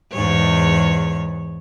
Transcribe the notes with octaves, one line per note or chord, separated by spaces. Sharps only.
E2 G#2 C#5